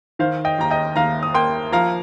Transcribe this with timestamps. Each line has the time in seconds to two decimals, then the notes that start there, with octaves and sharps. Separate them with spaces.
0.19 D#3 C5 F5
0.45 D#5 G5
0.59 D#2 A#5
0.71 D#5 G5
0.96 D#2 F5 A#5
1.23 D#6
1.35 A#3 G5 C6
1.72 F3 F5 A#5